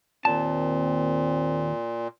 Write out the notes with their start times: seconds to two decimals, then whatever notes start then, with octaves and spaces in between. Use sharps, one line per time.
0.25 D#2 A#2 C4 A5